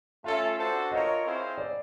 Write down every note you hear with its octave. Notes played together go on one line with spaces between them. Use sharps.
A3 C#4 F4 A4 E5
D4 F#4 A4 C5
F4 A#4 C#5 D#5
C4 E4 G#4 C5 F5
D5